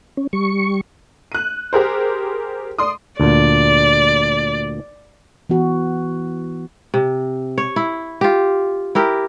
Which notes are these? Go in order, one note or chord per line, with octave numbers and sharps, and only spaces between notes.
C#4
G3 C#6
F#6 D#7
G4 G#4 A#4 C5
D5 C6 D#6
D2 A#2 D5
E3 B3 F#4
C3
C#5
E4
F4 G4
E4 G4 A#4